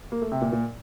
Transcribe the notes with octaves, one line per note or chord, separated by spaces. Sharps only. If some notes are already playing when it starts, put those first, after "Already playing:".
A#3
A3
C3
A#2
A#2